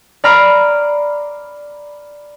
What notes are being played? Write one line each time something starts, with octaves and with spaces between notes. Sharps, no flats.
D5 A#5 B5 F6 C7 D7